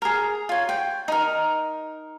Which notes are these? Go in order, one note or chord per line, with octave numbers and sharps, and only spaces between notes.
G#4 A#4
F4 C#5
G5
D#4 A#4